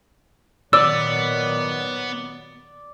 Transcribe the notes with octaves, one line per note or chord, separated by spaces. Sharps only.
A#2 D#3 F#3 B3 D5 E6